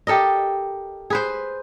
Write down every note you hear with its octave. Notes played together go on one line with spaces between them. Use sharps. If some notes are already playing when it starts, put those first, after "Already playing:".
G4 A4 A#4 D#5
G#4 B4 C5